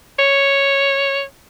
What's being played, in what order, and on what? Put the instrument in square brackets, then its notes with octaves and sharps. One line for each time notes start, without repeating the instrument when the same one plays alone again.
[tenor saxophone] C#5